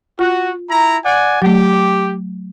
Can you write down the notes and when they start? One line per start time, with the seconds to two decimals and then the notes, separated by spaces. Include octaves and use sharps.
0.19 F4 F#4
0.70 E4 A#5
1.05 D5 F#5 G#5
1.42 F#3 A3 G4